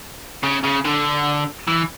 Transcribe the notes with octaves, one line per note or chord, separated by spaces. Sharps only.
C#3
C#3
D3
E3